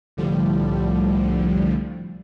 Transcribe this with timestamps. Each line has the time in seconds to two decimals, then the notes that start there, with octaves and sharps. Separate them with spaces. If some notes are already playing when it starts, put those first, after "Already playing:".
0.17 C2 A2 D3 F3 G3